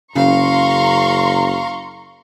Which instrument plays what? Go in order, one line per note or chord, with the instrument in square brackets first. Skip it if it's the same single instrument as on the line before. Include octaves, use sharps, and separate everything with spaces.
[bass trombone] F#1 [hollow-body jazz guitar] C#3 [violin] F5 [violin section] A#5 C6 C#6